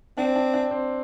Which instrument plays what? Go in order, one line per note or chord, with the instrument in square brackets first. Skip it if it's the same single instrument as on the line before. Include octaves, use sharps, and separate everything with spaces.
[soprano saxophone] C4 [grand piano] D4
[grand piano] D4
D4
C4